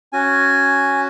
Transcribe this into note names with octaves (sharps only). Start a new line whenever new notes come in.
C#4 F#4 G#5